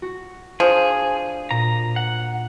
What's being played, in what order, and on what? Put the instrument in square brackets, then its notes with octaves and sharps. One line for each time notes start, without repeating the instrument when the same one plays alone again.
[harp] F#4
[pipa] F3 [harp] D4 [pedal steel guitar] G#4
[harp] A#2 [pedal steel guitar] A#5
[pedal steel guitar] F#5